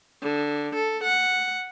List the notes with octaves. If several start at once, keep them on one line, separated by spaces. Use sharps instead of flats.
D3
A4
F#5